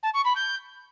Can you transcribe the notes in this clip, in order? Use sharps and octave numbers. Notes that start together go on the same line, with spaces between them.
A5
C#6
B5
G6